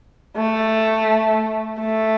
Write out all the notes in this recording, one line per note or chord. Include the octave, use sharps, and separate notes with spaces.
A3
A3